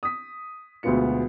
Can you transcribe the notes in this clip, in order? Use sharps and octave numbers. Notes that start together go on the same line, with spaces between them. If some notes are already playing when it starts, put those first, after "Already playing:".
D#6 B6
D2 B2 G#3 B3 F4 C#7